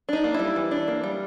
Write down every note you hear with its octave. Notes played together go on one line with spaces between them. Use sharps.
D4 D#4
A#3
G3 E4
E3
D4
A#3
G3